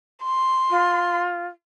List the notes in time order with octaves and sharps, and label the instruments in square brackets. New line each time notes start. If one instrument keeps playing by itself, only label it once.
[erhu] C6
[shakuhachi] F4